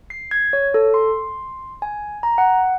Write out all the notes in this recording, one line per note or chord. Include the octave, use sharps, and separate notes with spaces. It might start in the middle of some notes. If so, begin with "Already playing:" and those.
C7
G#6
C#5
A4
C6
G#5
A#5
F#5